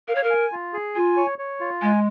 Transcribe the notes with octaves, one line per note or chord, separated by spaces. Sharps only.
A#4 F5
C#5
A#4
G#5
F4
G#4
F4 G#5
C#5
C#5
F4
G#3 G#5